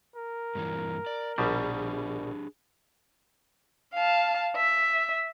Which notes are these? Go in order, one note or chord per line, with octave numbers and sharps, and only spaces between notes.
A#4
G2 A#2 E3
D5
A#1 B2 G3 D4 G4 G#4
F5 A5
E5